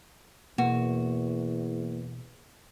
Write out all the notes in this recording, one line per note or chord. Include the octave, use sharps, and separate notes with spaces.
E2 B2 A#3 F#4